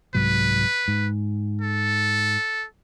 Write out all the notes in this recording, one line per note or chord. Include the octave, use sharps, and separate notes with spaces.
C2 G#2 F#3 B4
G#2
A4